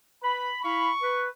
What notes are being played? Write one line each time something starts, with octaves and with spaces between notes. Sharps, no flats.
B4 B5
E4 F5 B5 C#6
B4